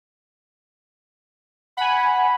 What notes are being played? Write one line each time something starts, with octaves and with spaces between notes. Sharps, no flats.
F#5 G#5 B5